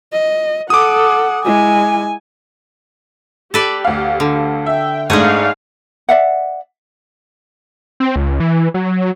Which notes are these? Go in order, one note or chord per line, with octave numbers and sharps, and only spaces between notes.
D#5
A4 F#5 D6 D#6
G#3 E4 G#5
G4 A4 B4 D5
D2 F5
D3
E5 G5
G#2 G#3 A3 D4 G#4 F5
D5 E5 F#5
C4
C#2
E3
F#3